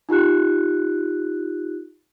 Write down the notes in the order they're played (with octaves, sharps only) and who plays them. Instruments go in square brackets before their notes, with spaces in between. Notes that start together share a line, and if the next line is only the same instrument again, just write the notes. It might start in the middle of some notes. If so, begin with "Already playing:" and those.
[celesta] D#4 F4 G4 F#6